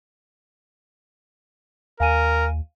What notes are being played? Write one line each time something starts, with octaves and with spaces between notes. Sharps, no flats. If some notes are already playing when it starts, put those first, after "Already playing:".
D#2 A#4 F5 G#5 D#7